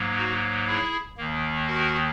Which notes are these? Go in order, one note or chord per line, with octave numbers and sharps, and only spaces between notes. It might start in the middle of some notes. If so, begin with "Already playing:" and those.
Already playing: G#2 F#3 A#3
D#4 F#4
E4 G#4
D#2 D#3 A#3
F#4 A#4